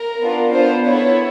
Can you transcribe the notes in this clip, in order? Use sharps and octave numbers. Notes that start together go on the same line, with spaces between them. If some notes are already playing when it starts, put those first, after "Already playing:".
Already playing: A#4
B3 D4 F4
B3 D4 F4 C5
B3 E4 A4 C#5